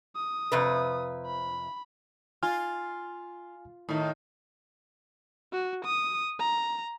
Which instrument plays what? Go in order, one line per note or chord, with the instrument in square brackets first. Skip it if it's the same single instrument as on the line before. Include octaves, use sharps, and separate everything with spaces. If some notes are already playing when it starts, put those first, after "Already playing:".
[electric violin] D#6
[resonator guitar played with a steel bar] F2 C3 B4
[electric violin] B5
[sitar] F4 [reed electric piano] G#5 F6
[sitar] A2 D#3
[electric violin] F#4
D#6
A#5